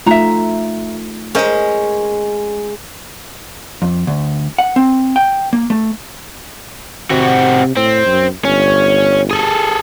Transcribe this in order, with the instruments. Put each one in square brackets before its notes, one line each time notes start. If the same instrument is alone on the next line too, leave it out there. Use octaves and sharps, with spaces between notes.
[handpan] A3 D#4 F4 [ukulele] E5 A#5
[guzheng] G#3 C#4 [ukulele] A#4 C5 D#5
[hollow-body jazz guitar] F2
D2
F#5
C4
G5
A#3
A3
[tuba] C3 [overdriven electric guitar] C4 F#4
[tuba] A2 [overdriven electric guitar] C4
[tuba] F#2
[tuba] G1 [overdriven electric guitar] C#4
[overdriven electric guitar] G#4 A4